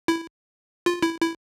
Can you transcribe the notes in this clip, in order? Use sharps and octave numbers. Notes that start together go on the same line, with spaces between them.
E4
F4
E4
E4